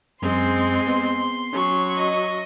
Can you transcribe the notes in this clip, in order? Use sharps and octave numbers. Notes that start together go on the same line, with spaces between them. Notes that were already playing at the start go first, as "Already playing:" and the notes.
F#2 G#3 C4 C6
B3
F#3 C#4 C#6
D#5